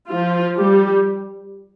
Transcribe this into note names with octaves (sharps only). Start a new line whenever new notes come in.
F3 F4
G3 G4